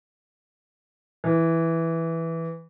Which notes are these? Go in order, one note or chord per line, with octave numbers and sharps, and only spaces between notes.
E3